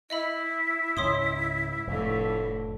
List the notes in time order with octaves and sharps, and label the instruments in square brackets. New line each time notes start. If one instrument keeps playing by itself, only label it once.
[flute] E4 [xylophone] D#5 E5 B5
[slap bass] C#2 G#2 [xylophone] C#5 C6 D#6
[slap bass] F1 [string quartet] F2 A2 D3